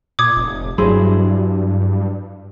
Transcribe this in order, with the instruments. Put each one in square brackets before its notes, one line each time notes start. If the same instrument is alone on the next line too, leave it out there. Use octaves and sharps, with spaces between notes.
[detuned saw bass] A#2 [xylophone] D6 D#6 G#6
[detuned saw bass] F1
[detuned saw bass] G2 [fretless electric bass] F#3 [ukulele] E4 G#4 C5